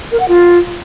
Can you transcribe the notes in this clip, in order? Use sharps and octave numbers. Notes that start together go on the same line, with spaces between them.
A#4
F#5
F4